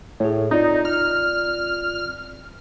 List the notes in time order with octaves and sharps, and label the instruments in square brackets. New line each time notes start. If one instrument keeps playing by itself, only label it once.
[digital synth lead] A2 [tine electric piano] G#4 C#5
[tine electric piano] C4 F4 D5 [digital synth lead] D#4
[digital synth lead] F6